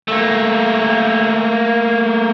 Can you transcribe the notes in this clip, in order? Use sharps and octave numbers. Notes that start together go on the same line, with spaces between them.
A3 A#3